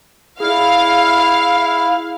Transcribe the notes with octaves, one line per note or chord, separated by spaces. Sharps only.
E4 G#4 D5 F5